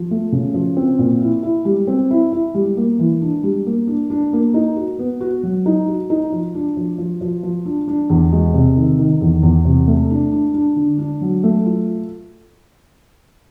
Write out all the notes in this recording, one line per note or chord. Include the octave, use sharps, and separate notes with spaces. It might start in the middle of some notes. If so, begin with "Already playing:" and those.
Already playing: F3
A3
C#3
F3
C4
A#2
E4
E4
G3
C4
E4
E4
G3
A#3
E3
D4
G3
A#3
D4
D4
A#3
D#4
F#4
B3
F#4
F#3
D#4
F#4
D#4
F3
D4
F3
F3
F3
F3
D4
D4
E2
G#3
C3
D#3
D#3
E2
E2
C3
A3
D4
D4
D4
D3
D4
F#3
A3
F4